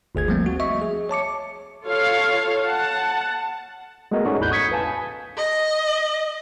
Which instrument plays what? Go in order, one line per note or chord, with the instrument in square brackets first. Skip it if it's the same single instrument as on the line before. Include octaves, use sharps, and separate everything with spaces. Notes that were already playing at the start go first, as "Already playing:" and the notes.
[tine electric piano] G1 D2 G#4 G#6
F3 G3 A3 A#3 C4
F#4
D#5 E5 C#6
G#4
C#5 A5 D6 C#7
[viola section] F4 A4 C#5 F5
F#5 A5
[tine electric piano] G#3 A3 B3 F#4 A#4 D#5
C#4 D#4 F#4 G#4 A4 D5
A1 E2 E4 B5 F#6 G6
C#6 D#6 G#6 B6 C#7
B4 F5 G#5 A5
[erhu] D#5